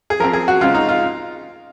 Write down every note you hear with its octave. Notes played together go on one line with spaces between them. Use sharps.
G#4
F3 C4 A#4
G#4
F#4
C#3 G#3 C4 F4
D#4
F4